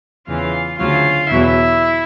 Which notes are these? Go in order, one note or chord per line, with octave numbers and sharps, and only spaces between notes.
E2 C#3 E3 F4 F5
D2 C#3 F#3 F4 F5
E2 B2 F#3 E4 E5